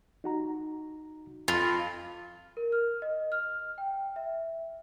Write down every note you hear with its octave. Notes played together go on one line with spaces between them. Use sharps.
D#4 F#4 A#5
F2 F4
A#4
F6
D#5
F6
G5
E5